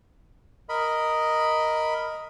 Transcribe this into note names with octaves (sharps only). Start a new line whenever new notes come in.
A#4 D#5 B5